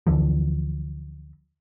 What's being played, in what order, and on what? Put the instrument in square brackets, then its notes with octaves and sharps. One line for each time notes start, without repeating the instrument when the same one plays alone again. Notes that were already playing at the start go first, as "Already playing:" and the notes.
[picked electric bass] D2 D3 E3 F3